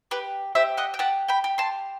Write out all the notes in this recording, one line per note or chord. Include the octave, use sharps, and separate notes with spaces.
G4 B4
G4 C5 E5
D#5 F#5
G5
G4 F#5 A5
G5 B5
G4
A5 C6